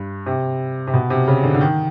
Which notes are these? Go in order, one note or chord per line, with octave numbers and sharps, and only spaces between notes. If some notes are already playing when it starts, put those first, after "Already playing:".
Already playing: G2
C3
C3
B2
C3
C#3
D3
D3
D#3